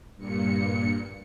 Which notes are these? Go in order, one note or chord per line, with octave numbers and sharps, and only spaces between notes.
G2 A#2 C#7